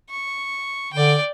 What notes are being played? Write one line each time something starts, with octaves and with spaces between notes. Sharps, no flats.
C#6
D3 D5 G5